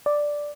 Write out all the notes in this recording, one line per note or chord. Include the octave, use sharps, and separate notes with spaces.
D5